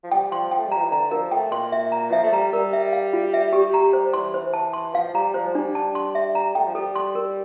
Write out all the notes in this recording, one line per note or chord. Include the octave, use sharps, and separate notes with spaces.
F3
G3 G5
F3 C6
G5
A3
G3
F3 A#5
E3
D3 A#5
F3 A#4
A3 G5
A#2 C6
E5
A#5
F3 E5
A3
G3 A#5
G3 A#4
E5
F5
F4
E5
G4
A#5
C5
E3 C6
C5
A5
C6
F3 F5
G3 A#5
F3 C5
G3 D4
A5
C6
E5
A#5
A3 G5
F3
G3 A4
C6
A#4